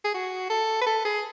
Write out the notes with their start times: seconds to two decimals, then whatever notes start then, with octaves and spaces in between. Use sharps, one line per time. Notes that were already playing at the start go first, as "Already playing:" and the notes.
0.05 G#4
0.14 F#4
0.50 A4
0.81 B4
0.87 A4
1.05 G#4